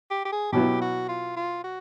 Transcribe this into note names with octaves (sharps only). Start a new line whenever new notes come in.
G4
G4
G#4
B2 F#3 B3 E4 G4
F#4
F4
F4
F#4